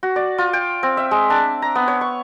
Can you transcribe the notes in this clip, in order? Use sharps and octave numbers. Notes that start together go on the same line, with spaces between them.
F#4
D5
F4
G5
C4
E5
G#3
D4
A#5
B3
C#5
C#6